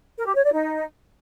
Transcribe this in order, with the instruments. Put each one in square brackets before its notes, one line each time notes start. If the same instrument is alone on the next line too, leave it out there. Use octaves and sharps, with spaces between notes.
[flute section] A#4
G4
C#5
D5
D#4